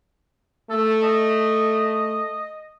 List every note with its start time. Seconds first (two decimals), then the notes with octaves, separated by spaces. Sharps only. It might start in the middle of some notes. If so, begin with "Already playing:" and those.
0.70 A3 A4
1.03 D#5